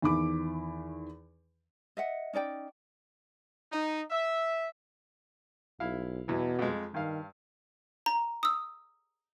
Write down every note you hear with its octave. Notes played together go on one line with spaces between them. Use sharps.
E2 D#3 B5 D6
D#5 E5 F#5
C#4 D#4 D5 G5
D#4
E5
B1 E4 F5
E2 B2 E3
F2 G#3
G2 D#3 F5
A#5
D#6 E6